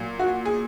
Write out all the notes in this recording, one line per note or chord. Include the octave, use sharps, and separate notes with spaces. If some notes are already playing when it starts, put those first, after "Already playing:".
Already playing: A#2 F#3
F#4
G#4